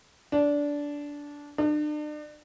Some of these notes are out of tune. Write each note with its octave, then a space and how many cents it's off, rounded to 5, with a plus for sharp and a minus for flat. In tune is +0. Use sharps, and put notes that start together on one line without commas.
D4 -15
D4 +40